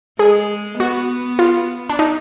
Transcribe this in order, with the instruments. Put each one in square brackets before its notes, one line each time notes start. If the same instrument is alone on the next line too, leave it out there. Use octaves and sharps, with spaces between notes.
[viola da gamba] G#3 [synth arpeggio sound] G#4
[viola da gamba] B3 [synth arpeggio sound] F#4
[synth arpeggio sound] F4
D4
D#4